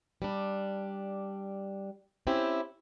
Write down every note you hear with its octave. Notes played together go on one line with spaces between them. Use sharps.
G3 D4
C4 C#4 E4 G4